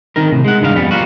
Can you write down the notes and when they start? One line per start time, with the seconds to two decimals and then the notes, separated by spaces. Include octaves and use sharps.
0.16 D#3 C4 D#4 A#4
0.32 A2 C3
0.45 G#3 F#5
0.61 C#2 G2 D#3 G#3 A#4 F5
0.75 F2 G3 B3
0.91 F3 G3 A#3 B3 F4 F#4